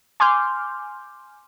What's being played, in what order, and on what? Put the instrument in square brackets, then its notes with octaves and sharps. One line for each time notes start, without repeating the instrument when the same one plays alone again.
[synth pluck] G#5 C6 D6 F6 G6